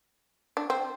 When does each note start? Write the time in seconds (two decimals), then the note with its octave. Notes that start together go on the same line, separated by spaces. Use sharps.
0.57 D4
0.70 C4